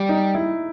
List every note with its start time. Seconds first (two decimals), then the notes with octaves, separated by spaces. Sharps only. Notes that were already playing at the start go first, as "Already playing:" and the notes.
Already playing: G3
0.09 D#4
0.35 E4